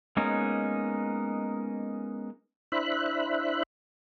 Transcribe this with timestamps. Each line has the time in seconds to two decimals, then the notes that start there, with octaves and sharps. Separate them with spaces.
0.17 G#3 A#3 B3 C#4 D#4
2.72 D4 E4 C5 E5 B5 F#6